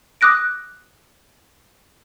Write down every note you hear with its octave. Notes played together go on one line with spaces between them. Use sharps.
D6 D#6 F#6 A#6 D7